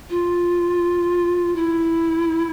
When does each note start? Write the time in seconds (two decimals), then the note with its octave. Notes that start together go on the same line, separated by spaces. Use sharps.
0.10 F4
1.56 E4